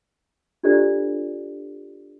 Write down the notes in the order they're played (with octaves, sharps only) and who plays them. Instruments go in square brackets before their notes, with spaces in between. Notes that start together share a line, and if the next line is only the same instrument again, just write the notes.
[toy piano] D4 F4 G4 A4 C5 D5